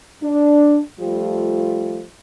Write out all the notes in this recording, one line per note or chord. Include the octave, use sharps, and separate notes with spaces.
D4
F3 G3 A3 F4